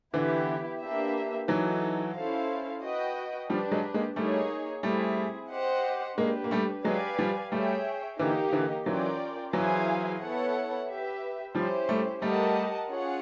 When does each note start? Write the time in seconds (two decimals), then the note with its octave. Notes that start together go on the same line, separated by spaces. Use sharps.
0.13 D3 E3 B3 E4 G4
0.81 A#3 D4 G4 B4 E5
1.48 E3 F#3 D#4 F#4 A4
2.15 C#4 E4 A4 C5 F5
2.82 F#4 B4 D#5 G5
3.49 F3 G3 D4 G4 B4
3.71 F#3 G#3
3.94 G#3 A#3
4.16 G3 A3 A#3 D#4 G#4 C#5
4.83 G3 A3 C4 E4 G#4
5.51 G4 C5 D#5 F#5
6.18 G#3 A#3 D4 G4 B4
6.44 A#3
6.51 G3 A3
6.85 F#3 G#3 G4 B4 D5 F5 G#5
7.19 F3 G3
7.52 G3 A3 G#4 C#5 E5 G5
8.19 D3 E3 A#3 D#4 G4 A#4
8.53 D3 E3
8.86 E3 F#3 C#4 F4 A#4 D5 G5
9.53 E3 F#3 E4 G#4 C5 F5 G#5
10.21 B3 E4 A4 C#5 F#5
10.88 G4 B4 E5
11.55 F3 G3 C#4 E4 G4 C5
11.89 G3 A3
12.22 G3 A3 G4 A#4 D#5 F#5 A5
12.89 C#4 F4 G#4 C#5 F#5